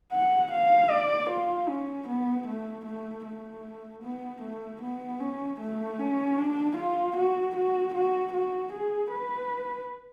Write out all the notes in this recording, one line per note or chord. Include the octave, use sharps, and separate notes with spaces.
F#5
F5
D5
F4
C#4
B3
A3
A3
A3
B3
A3
B3
C#4
A3
C#4
D4
F4
F#4
F#4
F#4
F#4
G#4
B4